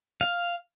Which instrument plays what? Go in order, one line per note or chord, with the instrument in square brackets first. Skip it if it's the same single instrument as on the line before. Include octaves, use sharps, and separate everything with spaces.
[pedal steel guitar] F5